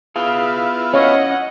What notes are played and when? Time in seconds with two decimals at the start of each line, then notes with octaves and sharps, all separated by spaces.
0.16 B3 E4 F4 G#4 F5
0.94 C#4 C#5 D#5 F5 F#5